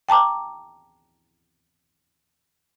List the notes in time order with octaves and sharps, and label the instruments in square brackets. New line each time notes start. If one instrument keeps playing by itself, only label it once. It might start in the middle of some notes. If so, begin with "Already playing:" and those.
[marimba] G5 A5 A#5 D6